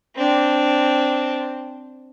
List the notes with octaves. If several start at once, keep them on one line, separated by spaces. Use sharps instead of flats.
C4 D4